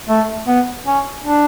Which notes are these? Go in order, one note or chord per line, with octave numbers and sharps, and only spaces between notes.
A3
B3
C#4
D4